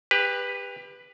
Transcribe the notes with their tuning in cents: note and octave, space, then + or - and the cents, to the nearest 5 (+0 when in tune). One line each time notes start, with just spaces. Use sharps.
G4 +30 B4 +0